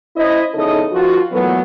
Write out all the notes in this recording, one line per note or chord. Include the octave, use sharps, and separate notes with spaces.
C#4 E4 C5 D#5
E2 C#3 D#4 E4 A4 D#5
D#3 F3 F4 F#4
A#2 E3 F#3 A3 B3